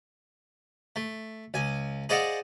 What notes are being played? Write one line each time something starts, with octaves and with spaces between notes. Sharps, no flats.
A3
C#2 G#5
G#4 C5 D5 D#5 F5 F#5